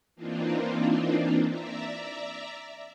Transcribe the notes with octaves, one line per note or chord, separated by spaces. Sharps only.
E3 A#3 C4 D4 D#4 F4
D5 E5 A#5